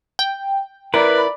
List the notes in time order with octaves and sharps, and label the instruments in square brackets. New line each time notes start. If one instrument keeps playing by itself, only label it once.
[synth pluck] G5
[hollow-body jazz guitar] E4 A#4 [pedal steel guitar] B4 [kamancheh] D5 B5